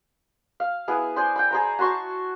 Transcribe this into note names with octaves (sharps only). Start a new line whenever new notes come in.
F5
B3 E4 G#4
G#4 C5 D5 C6
G5 B5
G#4 C5 A#5
F#4 A5 C6 C#6